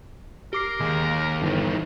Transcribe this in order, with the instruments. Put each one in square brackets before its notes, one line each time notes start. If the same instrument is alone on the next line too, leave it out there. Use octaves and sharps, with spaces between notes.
[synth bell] G4 D6 C7 [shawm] A#4
[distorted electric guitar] D#2 [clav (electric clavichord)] G#3
[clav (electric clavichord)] G1 A5 [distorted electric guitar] D#3 E3